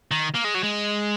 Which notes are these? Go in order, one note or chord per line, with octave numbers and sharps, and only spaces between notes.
D#3
A#3
G#3
F#3
G#3